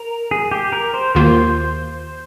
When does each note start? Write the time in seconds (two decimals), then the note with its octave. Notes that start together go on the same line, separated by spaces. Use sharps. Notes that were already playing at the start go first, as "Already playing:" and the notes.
Already playing: A#4
0.31 G#4
0.51 G4
0.72 A#4
0.94 C5
1.15 D#2 D#3 A#3 F4 C5